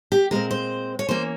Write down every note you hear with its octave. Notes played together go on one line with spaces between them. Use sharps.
G4
A#2 G#3 C4 A#4
C5
C#5
E3 A#3 C#4 C5